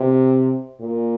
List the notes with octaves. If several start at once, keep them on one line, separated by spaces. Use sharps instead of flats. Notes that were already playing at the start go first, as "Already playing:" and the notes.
Already playing: C3
A#2